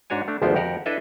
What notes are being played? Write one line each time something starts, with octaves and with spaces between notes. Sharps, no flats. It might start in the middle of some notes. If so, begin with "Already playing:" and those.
G#2 D4 F#4 C#5 G#5
A3 D4
G#1 D2 F3 B3 C5 G5
F2 F#4 G4 A#4 F#5
D4 E4 A4 B4 D#5 E5